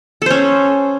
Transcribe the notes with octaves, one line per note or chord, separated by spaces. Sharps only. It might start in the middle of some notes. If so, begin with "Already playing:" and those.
C#4 A4 C5